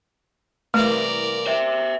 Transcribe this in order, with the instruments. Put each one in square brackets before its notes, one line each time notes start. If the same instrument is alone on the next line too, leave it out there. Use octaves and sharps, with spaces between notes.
[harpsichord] C2 E3 A#3 [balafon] A3 [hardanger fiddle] A#4 D5
[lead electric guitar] C5 E5